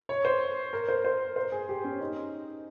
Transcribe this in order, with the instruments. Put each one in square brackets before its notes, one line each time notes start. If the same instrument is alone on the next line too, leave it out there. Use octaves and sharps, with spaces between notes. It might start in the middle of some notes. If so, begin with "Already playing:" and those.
[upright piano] C#5
C5
A#4
C5
C5
C5
G#4
G4
C#4
D#4